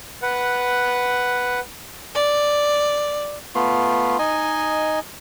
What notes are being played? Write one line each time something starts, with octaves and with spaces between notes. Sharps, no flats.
B4 F#5
D5
A3 B3 F4 C6
D#4 D#5 G#5